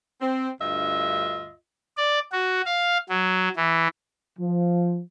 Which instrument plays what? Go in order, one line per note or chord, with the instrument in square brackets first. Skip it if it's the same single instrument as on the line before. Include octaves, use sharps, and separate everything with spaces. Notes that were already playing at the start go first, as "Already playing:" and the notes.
[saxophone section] C4
D2 G2 F4 D#5 E5
[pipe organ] D5
F#4
F5
F#3
E3
[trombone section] F3